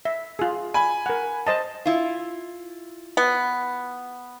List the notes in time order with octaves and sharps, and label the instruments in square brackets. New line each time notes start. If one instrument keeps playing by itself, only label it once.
[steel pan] E5
F4 G#4
[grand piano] G#5 B5
[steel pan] A#4 F#5
C5 D#5 A5
[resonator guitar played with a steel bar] E4 F4
[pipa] B3